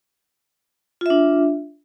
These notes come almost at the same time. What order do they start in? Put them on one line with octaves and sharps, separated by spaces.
F4 E5 D4